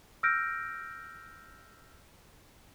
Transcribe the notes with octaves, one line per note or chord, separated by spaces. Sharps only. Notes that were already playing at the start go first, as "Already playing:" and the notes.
E6 F6 G6 A#6 D7